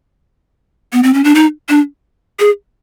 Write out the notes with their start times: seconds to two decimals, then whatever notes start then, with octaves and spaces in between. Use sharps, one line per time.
0.93 B3
1.03 C4
1.14 C#4
1.24 D4
1.35 D#4
1.69 D4
2.39 G#4